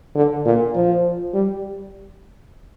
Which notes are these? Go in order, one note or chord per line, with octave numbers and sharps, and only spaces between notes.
D3
A#2
F3
G3